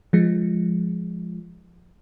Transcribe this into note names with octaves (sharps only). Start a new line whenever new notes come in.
F3 G#3